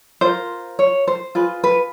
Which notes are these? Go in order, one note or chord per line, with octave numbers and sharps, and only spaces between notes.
F4 A#4 C5
C#5
C5
F4 G#4 B4
B4